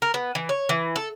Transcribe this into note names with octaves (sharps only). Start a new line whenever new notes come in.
A#4
B3
E3
C#5
E3
A4